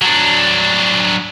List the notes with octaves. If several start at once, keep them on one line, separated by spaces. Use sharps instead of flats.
F#3 D4